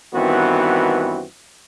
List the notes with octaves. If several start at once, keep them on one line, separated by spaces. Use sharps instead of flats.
G2 D#3 E3 B3 C4 F#4